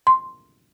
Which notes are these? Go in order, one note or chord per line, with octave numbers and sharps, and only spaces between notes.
C6